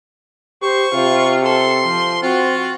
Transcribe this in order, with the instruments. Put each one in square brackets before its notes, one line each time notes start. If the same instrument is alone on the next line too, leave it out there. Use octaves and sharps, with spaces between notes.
[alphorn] G4 [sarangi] C5 [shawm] C#6
[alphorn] C3 [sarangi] F4
[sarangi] A4 [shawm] C6
[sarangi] F3
[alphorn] C4 [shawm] F4 [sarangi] F#4